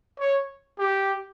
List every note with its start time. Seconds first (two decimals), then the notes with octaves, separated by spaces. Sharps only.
0.19 C#5
0.78 G4